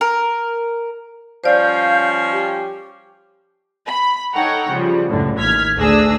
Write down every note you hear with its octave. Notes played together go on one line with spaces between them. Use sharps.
A#4
F3 G3 C#4 C5 D5 F5 G6
G4
B5
D#4 A4 C#5 F#5 G5 A#5
C#3 F3 G3
C#2 F#2 A2 D3
A1 D#2 F6 G#6 B6
D2 D4 G#4 D#6 E6 A#6